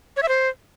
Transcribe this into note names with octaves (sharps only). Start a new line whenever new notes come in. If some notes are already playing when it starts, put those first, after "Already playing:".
C#5
E5
C5